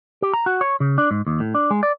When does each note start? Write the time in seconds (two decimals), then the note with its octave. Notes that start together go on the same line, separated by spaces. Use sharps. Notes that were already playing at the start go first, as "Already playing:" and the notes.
0.22 G4
0.34 A#5
0.46 F#4
0.61 C#5
0.80 C#3
0.98 D4
1.11 G#2
1.27 D#2
1.40 A2
1.55 D4
1.71 G#3
1.83 D5